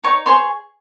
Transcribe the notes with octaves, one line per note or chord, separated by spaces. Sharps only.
D#4 C#5 C#6
G#4 C5 C#5 C6